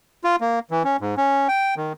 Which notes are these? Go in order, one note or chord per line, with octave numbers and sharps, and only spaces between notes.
F4
A#3
E3
C#4
G#2
C#4
G5
D#3